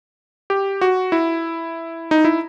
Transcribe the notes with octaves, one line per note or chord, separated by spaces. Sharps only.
G4
F#4
E4
D#4
E4